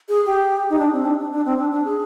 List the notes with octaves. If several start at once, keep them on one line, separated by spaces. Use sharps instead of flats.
G#4
G4
D#4
D4
C4
D4
D4
D4
C4
D4
D4
G#4